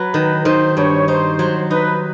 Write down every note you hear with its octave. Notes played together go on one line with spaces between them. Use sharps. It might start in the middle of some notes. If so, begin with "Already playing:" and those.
Already playing: F#3 B4
D#3
D#3 C5
G2 C#5
D#4 C5
F#3
D#4 B4